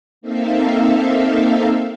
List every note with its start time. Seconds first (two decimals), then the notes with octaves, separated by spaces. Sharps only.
0.21 A#3 C4 D#4 A4 E5 F5